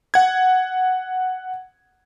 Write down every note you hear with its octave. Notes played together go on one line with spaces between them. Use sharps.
F#5 G#6